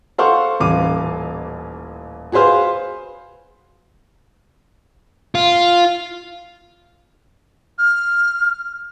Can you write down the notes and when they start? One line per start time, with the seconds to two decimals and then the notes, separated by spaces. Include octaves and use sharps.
0.18 A4 C5 F5 F#5 C#6
0.60 D#1 A1 E3 F5 D6 D#7
2.32 F#4 G#4 B4 C5 F5
5.35 F4
7.78 F6